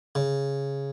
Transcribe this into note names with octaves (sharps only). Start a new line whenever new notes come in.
C#3